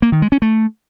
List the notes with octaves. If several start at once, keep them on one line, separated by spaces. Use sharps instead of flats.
A#3
D#3
G#3
C#4
A3